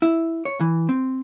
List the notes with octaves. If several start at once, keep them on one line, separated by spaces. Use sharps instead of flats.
E4
C#5
E3
C4